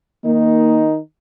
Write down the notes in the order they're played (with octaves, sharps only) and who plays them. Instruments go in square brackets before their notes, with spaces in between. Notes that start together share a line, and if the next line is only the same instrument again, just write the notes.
[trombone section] D#3 D#4 [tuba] A#3